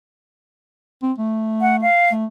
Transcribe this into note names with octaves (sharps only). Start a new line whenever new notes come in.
C4
A3
F#5
F5
A3